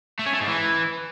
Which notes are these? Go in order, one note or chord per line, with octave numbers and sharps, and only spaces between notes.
A3
C#4
A3
G#2
E3